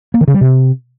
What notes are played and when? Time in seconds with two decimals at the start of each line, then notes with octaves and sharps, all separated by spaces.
0.14 A#3
0.21 D#3
0.28 C#3
0.34 G3
0.41 C3